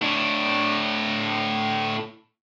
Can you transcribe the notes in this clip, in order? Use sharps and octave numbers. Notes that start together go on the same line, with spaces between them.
A2 D4